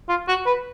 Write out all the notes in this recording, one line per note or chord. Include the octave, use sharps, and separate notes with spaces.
F4
F#4
B4